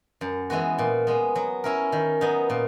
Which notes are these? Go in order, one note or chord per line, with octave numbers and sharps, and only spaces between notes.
F#2
E3 G#3 B3 F#4
A#2
G#3 B3
F#3
C#4 E4 A#4
D#3
F#3 B3 D#4
A#2